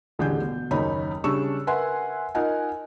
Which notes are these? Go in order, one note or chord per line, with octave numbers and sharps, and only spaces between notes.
D#1 A1 D3 G3 G#4 G6
B2
F#1 D#2 D#4 C#5 B5
C#3 G3 D4 C#6 E6 E7
A#4 B4 E5 F#5 G#5 C6
D#4 F4 A#4 D#5 F#5 G#5